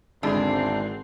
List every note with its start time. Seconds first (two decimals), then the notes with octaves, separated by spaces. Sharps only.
0.23 G#1 E2 D3 G#3 C4 D4 E4